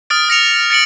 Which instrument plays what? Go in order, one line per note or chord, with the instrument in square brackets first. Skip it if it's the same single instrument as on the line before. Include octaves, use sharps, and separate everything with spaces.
[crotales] D#6 F6 A6 D7
F6 A#6 C#7 F7
A6 C#7 D7 F#7